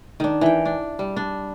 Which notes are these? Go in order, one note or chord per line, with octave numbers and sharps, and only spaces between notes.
D#3 D4
E3 G5
D4
G3
D4